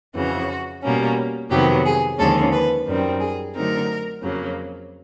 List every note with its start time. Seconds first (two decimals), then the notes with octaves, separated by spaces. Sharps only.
0.15 F2 C#3 E3 F#4
0.83 B2 G3 A#3 C#4
1.51 F2 C3 D#3 F#3 B3 G4
1.85 G#4
2.18 D#2 D3 F3 G#3 C#4 A4
2.52 B4
2.86 F#2 D#3 G3 C4
3.20 G#4
3.55 D3 F#3 A3 C4 D#4 A#4
4.23 F2 C#3 F#3 A#3